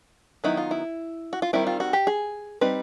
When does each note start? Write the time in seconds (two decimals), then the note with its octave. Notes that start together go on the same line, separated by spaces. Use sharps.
0.44 D#3 F#3 B3 D#4 E4
0.57 F4
0.71 E4
1.33 F#4
1.42 F4
1.53 D#3 G3 C4 E4
1.67 F4
1.80 F#4
1.93 G4
2.07 G#4
2.61 G3 C4 D#4 B4